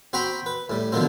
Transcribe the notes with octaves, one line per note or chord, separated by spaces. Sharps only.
C4 F#4 C5 G5 A#5 B5
B4
A2 G3
B2 D3 D#3 F3 F#3 C4